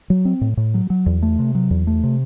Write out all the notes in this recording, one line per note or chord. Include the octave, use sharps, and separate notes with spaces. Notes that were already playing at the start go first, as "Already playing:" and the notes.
F#3
C4
A2
A2
F#3
F#3
E2
A3
C3
F#3
E2
A3
C3